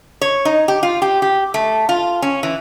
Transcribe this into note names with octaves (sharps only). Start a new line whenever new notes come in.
C#5
D#4
G4
F4
G4
G4
A3
F4
C#4
E3